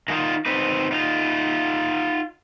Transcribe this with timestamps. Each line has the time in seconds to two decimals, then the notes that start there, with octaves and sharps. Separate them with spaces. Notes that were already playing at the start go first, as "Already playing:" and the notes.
0.08 D#3 G#3 A#3 D#4 F4
0.46 C4 D#4 B4
0.92 D#4 F4